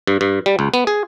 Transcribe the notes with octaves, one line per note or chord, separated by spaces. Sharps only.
G2
G2
G3
C#2
B3
G#4